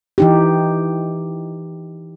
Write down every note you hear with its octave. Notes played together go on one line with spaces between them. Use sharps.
E3 D#4 G4